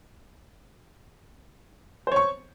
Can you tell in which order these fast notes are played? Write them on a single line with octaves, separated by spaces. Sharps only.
C5 C#5 C#6